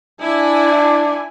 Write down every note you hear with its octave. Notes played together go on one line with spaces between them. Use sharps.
D4 E4 G#5